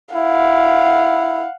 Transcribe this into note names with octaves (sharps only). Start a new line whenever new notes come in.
E4 F5 F#5